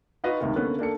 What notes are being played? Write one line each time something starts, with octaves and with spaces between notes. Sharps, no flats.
D#4 F4 F#4 B4 D#5 F5
C#2 C3 D#3
D3 A#3 B3 C#4
A#3 D4 A4 C#7